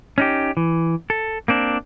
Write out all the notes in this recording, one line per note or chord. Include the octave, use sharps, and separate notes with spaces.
C#4 D#4 G4
E3
A4
A#3 C4 D4